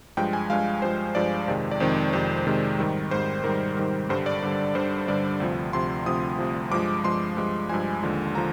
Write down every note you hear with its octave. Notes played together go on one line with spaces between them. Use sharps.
G2 F3 G#3 G5
G#5
G2 F3 G#3 F5
G2 F3 G#3 C5
G2 F3 G#3 D5
F2 C3 D#3 G#3
D5
F2 C3 D#3 G#3 C5
F2 C3 D#3 G#3 C5
F2 C3 D#3 G#3
G#2 D#3 G3
G#2 D#3 G3 C5
G#2 D#3 G3 A#4
G#2 D#3 G3
G2 D3 G3 C5
D5
G2 D3 G3
G2 D3 G3 C5
G2 D3 G3 D5
D2 C3 F3
D2 C3 F3 C6
D2 C3 F3 D#6
D2 C3 F3
G2 F3 G#3 D6
G2 F3 G#3 C6
G2 F3 G#3
G2 F3 G#3 G#5
D#2 D3 F3 G#3
D3 F3 A#5